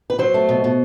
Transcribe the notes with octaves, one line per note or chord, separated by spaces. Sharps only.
B4
F#3 C5
A3
B2
B2